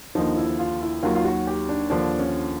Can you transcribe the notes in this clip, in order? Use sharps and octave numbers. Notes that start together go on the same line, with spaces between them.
D#2 D3 F3 D#4
E4
F4
E4
D#2 D#3 F#3 F4
F4
F#4
G4
D4
D#2 D3 F3 D4
C#4